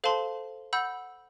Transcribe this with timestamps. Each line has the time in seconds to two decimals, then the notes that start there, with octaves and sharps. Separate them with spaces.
0.04 A4 C5 F5 A5 C6
0.73 F#5 B5 E6 G6